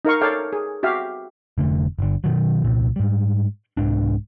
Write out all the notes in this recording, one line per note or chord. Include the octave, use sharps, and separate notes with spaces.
D#4 A#4 F5 C#6
A4 C#5 D5 F5 G5
G#4
F#4 G4 E5 F5
F1 D3 A3
G1 D3
B2 D#3 F#3
C2 A#2
G#2 G3
C2 G#2 D4